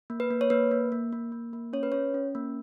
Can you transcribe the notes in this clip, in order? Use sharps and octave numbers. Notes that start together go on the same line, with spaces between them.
A#3
B4
A#3
C#5
A#3 B4
A#3
A#3
A#3
A#3
A#3
C#4 C#5
B4
C#4 C#5
C#4
A#3